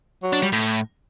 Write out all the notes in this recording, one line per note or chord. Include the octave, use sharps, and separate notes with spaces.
F#3
D4
G3
A2